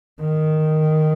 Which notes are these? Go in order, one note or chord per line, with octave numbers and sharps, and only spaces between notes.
D#3